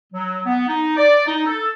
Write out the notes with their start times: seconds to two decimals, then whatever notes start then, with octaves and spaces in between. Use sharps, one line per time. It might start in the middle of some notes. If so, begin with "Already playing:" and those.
0.13 F#3
0.46 B3
0.68 D#4
0.96 D5
1.27 D#4
1.46 A4